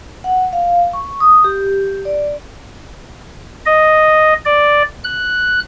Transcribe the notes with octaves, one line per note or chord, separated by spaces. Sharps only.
F#5
F5
C#6
D#6
G4
D5
D#5
D5
F#6